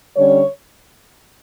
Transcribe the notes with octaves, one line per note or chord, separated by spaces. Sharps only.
D3 G3 C#4 C#5